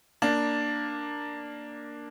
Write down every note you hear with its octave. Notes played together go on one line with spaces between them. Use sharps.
A#3 D4